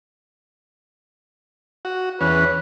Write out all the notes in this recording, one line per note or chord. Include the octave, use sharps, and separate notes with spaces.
F#4
E2 C#4 B4